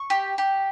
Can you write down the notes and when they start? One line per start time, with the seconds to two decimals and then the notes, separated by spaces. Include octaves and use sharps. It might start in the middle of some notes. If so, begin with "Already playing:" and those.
Already playing: C#6
0.10 G4
0.38 G4